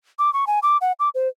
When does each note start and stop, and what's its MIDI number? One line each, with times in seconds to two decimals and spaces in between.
0.19 0.33 86
0.33 0.45 85
0.47 0.59 80
0.63 0.77 86
0.81 0.92 78
1.00 1.09 86
1.15 1.28 72